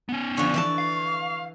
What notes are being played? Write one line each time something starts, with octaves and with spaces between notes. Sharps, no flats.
B3 C#4
D3 F3 C#6
E3 D5 A5
F5